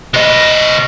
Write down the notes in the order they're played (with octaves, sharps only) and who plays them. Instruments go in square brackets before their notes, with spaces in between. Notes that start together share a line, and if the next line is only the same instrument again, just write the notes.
[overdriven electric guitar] C3 D#5